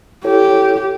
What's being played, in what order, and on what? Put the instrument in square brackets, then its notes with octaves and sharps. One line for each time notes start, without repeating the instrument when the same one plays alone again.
[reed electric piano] E4 A4 C#5 [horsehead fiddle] G4